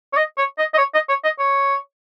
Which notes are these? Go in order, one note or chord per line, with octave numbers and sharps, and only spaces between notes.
C#5
D#5
C#5
D#5
D#5
C#5
D#5
C#5
D#5
C#5